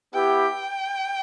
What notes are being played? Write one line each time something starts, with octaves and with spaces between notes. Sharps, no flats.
B3 E4 G4 G5